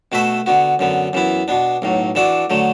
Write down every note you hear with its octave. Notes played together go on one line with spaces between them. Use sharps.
B2 A3 F#4 B4 E5
D3 B3 F#4
F#2 D3 B3
F#2 E3 B3 E4
B2 B3 D4
B1 A2 F#3
E3 D4 F#4 A4 D5
D3 F#3 A3